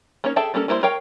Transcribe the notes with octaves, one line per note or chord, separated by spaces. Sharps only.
A#3 C#4 D#4 C#5
G#4 A4 E5 G5 A5
G3 A#3 C#4 A4
G3 A#3 E4 A#4 C5
A#4 C#5 F5 G5